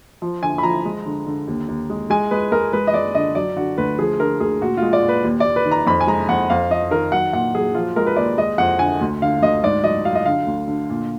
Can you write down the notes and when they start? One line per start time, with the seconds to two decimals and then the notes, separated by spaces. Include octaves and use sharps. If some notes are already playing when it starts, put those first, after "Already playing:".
0.22 F3
0.43 D3 G#5
0.58 B5
0.63 F3 A#5
0.85 G#3
1.06 D3
1.27 D3
1.48 D#2
1.68 D#2
1.90 G#3
2.10 G#3 G#5
2.31 G#3 B4
2.52 G#3 A#4
2.73 G#3 B4
2.87 D#5
2.94 G#3 D5
3.15 D3 D#5
3.35 F#3 D5
3.56 D3 F#4
3.78 D2 B4
3.99 F3 G#4
4.20 D3 A#4
4.40 D2 G#4
4.61 A#2 F#4
4.77 G#3 F4
4.93 D5
5.03 A#2
5.09 B4
5.24 D#2
5.40 D#2 D5
5.56 B4
5.66 D#3
5.71 A#5
5.86 F2 B5
6.01 G#5
6.07 G#3 A#5
6.28 F2 F#5
6.50 F2 F5
6.71 F2 D#5
6.91 D#3 A#4
7.12 F#3 F#5
7.33 A#2 F#5
7.55 F#3 G#4
7.74 F3 F4
7.96 G#3 A#4
8.06 B4
8.16 D#2 D5
8.38 G#3 D#5
8.58 F2 F#5
8.79 D3 G#5
9.01 D2
9.22 D3 F5
9.42 D2 D#5
9.63 G#2 D5
9.84 F#3 D#5
10.05 F#3 F5
10.15 D#5
10.26 D3 F5
10.46 D2
10.68 D3
10.89 A#2